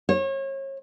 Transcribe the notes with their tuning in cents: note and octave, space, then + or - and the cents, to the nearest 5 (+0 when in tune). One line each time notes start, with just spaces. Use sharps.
C#5 -35